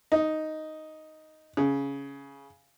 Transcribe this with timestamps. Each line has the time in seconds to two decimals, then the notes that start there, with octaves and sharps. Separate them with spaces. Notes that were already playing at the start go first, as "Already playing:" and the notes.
0.12 D#4
1.57 C#3